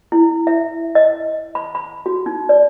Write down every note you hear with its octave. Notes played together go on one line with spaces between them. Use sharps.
E4
E5
D#5
B5
B5
F#4
D#4
D5